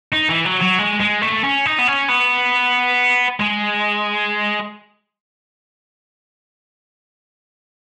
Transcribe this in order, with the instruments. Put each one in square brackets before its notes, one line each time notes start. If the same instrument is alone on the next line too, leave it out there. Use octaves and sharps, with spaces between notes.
[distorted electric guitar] D#4
E3
F#3
F#3
G#3
G#3
A3
C#4
D#4
B3
C#4
B3
G#3